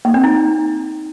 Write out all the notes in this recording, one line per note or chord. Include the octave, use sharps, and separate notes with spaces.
A#3
C4
D#4